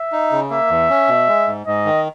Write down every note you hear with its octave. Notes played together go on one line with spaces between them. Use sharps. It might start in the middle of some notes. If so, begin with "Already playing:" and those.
Already playing: E5
D#4
C#3
A#3 E5
E2
C#4
B2
G#3
G#2
G#2 D#5
D#3